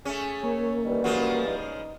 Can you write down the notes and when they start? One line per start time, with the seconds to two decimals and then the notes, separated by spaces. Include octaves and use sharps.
0.05 A3 C#4 G#4
0.43 A#3 C#5
0.85 D#3 E3 G3
1.04 C#3 F3 G#3 F#4
1.47 D#4